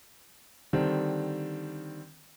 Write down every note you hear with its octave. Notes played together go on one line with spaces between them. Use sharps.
D3 D#3 G3 C4 D4